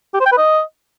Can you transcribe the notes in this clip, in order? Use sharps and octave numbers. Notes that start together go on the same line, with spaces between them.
G4
C5
G5
B4
D#5